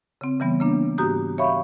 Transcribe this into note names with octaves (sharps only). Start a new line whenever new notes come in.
C#3 C4
C#3 E3 G3 B3
C#3 A#3 D4
G#2 F#4 G4 A#5 D#6 G6
C#5 E5 F5 B5 C#6